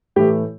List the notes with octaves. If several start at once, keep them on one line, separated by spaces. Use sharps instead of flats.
A2 E3 A3 G4